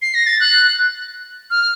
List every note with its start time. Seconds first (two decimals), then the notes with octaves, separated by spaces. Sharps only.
0.02 C7
0.14 A#6
0.26 A6
0.40 F#6
1.50 F6